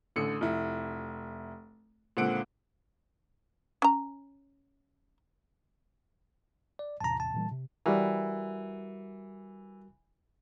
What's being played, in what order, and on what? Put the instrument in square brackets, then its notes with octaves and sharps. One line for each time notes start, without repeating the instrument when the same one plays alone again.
[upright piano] A1 D3 C#7
F1 E4
C#2 A#2 D3 C4 F#5 D7
[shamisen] C#4 A#5
[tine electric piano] D5
[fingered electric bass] A1 E2 C3 [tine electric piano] A5 A#5
[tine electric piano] A5
[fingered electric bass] A#2 E3 G3
C3
[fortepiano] E3 [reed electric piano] G3 F#4 A#4